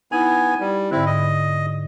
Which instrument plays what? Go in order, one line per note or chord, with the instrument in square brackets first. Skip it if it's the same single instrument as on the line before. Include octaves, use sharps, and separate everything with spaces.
[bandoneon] B3 G#5 [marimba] D#4 E4
[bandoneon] G3
[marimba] G#2 D3 [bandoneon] C4 E4
[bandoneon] D#5